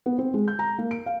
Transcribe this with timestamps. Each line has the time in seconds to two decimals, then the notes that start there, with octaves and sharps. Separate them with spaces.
0.06 B3
0.18 C4
0.34 G#3
0.48 G6
0.59 A#5
0.78 A#3
0.91 D7
1.06 F5